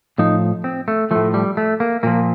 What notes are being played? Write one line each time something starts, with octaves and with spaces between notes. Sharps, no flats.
A2 F3 D#4
C4
A3
A2 F3 A3
G3
A3
A#3
A#2 F3 A#3